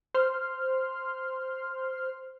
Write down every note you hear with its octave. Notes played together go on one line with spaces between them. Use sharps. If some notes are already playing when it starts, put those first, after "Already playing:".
C5 C6 F6